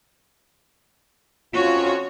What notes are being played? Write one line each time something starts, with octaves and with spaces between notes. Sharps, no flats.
F2 C#4 F4 F#4 C#5